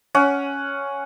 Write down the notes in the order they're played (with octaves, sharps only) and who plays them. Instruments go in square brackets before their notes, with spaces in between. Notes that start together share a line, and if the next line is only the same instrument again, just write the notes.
[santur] C#4 F#5